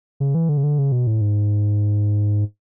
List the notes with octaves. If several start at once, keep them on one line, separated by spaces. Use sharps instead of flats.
C#3
E3
D3
C#3
D3
C#3
B2
A2
G#2